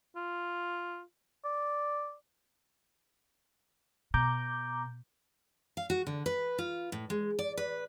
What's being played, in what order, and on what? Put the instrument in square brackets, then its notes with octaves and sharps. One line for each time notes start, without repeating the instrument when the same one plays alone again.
[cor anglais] F4
D5
[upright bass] B2 [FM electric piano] A#5 D6 G6
[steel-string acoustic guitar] F5
F#4
D3
B4
F4
A2
G#3
D5
B4